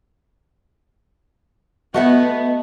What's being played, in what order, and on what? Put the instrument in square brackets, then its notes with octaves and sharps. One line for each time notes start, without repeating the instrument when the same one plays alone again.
[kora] A3 F#4 [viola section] B3 [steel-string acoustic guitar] D#5 E5 F#5